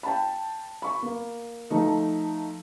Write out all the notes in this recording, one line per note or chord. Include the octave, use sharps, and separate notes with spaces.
G5 A5 B5
B5 C#6
A#3
F3 A3 D#4